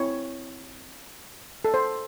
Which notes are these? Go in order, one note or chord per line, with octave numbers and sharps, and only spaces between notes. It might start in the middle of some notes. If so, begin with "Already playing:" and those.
Already playing: C4 E4 C#5
A4
C5